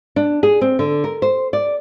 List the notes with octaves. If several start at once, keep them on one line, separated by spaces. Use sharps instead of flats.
D4
G#4
C4
D3
A#4
C5
D5